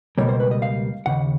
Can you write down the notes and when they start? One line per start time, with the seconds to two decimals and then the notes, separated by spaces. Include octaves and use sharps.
0.18 C#2 B2 G3 A#3 C#5
0.29 C5
0.40 B4
0.51 D#5
0.62 F5
1.06 D#2 C#3 F#5